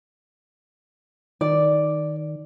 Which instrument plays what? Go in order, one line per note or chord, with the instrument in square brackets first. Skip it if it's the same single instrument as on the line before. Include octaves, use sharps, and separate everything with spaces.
[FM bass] D#3 [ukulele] D5